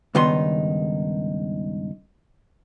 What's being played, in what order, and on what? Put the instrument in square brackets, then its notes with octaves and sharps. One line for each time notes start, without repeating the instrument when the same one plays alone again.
[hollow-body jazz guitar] C#2 G2 D#3 B3 D#4 C6